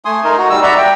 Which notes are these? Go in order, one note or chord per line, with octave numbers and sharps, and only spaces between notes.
A3 G#5 C6 D#6
D#4 A#4
D#4 F#4
G3 E6
D5 E5 F#5 A#5
G5